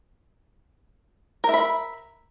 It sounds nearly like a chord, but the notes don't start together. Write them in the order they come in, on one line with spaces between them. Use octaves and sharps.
A#4 E5 B5